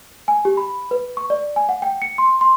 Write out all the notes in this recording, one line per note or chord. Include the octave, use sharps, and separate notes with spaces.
G#5
G4
B5
B4
C#6
D5
G#5
F#5
G5
C#7
C6
C6